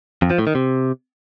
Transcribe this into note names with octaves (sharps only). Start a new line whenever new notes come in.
F2
F3
A2
D#3
C3